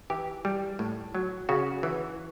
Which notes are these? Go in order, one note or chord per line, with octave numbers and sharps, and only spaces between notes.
E3 G4
G3
A2
F#3
C#3 F#4
E3